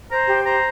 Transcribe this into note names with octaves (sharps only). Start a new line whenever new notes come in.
C5 A#5
G4
C5 A#5